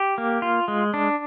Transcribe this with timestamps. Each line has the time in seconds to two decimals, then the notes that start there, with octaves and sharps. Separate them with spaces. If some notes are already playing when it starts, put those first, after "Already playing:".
Already playing: G4
0.18 A#3
0.42 F4
0.68 G#3
0.94 D4